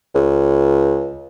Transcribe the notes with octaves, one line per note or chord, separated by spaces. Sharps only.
C#2